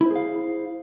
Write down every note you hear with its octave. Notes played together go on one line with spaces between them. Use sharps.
E4 G#4 C5 F5